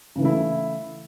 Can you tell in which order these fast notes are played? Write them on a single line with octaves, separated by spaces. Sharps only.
C#3 E3 A3 E4